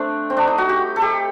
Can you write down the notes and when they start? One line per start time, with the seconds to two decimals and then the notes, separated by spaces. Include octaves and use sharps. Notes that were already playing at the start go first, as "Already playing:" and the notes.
Already playing: A3 C4 D4
0.30 C4
0.37 D4
0.47 D#4
0.58 F#4
0.69 G4
0.96 A4
1.02 G4